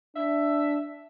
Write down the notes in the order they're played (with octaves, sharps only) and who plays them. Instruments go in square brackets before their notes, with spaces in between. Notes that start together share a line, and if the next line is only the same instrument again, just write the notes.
[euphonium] D4 [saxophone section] E5